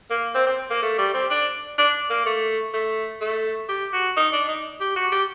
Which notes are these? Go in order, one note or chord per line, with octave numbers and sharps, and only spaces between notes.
A#3
C4
C4
A#3
A3
G3
C4
D4
D4
A#3
A3
A3
A3
G4
F#4
D#4
D4
D#4
G4
F#4
G4